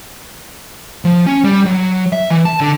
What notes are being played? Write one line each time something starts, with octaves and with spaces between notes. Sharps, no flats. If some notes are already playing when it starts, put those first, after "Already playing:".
F3
C#4
G3
F#3
E5
E3
A5
D3